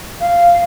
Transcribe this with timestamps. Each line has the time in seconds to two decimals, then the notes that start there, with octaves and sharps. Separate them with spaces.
0.21 F5